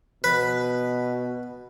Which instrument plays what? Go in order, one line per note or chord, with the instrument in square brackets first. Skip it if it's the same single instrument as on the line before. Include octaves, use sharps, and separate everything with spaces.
[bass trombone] B2 [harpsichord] B4